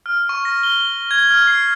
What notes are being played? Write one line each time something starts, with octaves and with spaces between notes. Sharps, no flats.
F6
C#6
A#6
G7
G#6
F6
C7